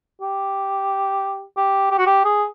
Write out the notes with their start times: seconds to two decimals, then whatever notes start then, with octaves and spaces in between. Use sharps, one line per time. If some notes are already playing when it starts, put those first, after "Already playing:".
0.21 G4
1.57 G4
1.91 G4
1.98 F#4
2.06 G4
2.25 G#4